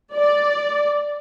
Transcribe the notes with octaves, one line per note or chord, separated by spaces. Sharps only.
D5